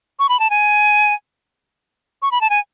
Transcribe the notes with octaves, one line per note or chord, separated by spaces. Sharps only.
C#6
B5
A5
G#5
C#6
B5
A5
G#5